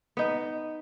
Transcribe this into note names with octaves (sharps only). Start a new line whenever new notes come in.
B3 D#4